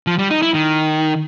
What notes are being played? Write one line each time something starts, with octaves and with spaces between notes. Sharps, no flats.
F3
G3
D#4
E4
D#3